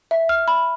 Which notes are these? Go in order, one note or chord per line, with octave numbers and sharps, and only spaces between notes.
E5
F6
B5